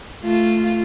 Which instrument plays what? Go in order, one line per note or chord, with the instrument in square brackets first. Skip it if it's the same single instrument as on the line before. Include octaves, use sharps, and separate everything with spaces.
[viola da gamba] A3 F4